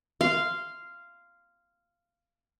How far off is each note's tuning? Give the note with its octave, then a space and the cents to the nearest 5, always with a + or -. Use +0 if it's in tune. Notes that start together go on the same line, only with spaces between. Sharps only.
F5 -10 C6 -10